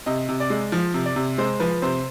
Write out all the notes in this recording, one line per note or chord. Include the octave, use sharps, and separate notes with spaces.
C3 D#5
C3
D5
G#3
F3
C3
D5
C3
G#3 C5
F3 B4
C3 C5